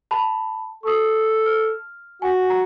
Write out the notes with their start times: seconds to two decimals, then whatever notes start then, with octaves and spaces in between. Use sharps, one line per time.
0.11 A5 B5
0.83 A4 C#6 D#6
1.46 F6
2.22 F#4 G#5
2.50 A#5